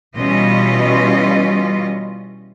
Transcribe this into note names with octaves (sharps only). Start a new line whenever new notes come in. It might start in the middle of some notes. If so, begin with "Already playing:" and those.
B2 E3 G3 C#4 F4 D#5